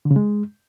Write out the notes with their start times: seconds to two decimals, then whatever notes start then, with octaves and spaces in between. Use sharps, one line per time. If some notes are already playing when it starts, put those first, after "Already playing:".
0.05 D3
0.11 C#3
0.16 G#3